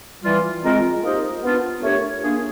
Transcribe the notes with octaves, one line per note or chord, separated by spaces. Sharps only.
E3 G3 C4 F4
G#3 C4 F4 A#4
A#3 D#4 G4 C5 D#5
B3 D4 F4
A3 D4 G4 A#4 C#5
A#3 D4 F4 G#4